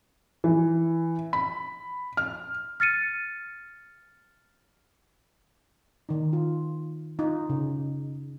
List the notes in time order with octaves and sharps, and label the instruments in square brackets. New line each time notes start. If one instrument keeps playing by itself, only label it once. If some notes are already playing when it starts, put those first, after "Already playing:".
[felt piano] E3
B5
F6
[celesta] F6 A6 C#7 D#7
[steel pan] D#3 D#4
F4
D#4 F4
C#3